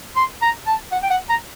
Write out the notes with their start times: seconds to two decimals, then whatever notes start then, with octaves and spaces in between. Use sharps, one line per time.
0.16 C6
0.42 A#5
0.66 A5
0.92 F#5
1.03 G5
1.10 F#5
1.29 A#5